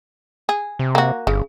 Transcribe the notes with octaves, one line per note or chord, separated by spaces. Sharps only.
G#4
C3
A#3 F#4
G1 C#3